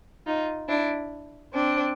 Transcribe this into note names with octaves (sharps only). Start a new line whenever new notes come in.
D#4 F4
D4 E4
C4 D4